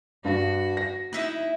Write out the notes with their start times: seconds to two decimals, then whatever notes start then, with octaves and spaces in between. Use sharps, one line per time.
0.25 G2 F#4
0.77 A#6
1.13 D#4 E4 E5 F#6